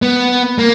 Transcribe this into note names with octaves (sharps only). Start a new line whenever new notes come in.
B3
A#3